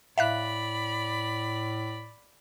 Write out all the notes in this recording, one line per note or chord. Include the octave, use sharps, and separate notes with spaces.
A2 D5 E5 F5 B5 F#6